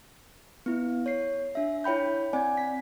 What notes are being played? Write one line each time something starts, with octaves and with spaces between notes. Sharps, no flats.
B3 E4
C#5 C7
D4 E5
E4 C#5 G5 B5 G6
C4 D5 G#5
B6